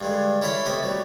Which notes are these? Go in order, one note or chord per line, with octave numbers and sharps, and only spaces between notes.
G2 D3 G#3
C#4 E4 A4 C#5 B5 C6
C3 A3 B3 D#5 B5
F#3 G3